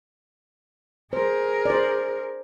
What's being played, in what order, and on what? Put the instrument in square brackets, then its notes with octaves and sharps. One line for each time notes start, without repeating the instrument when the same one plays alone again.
[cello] G#4 A#4 [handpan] C5
[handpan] C5 D5